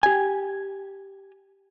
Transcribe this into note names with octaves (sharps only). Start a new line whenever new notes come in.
G4 G#5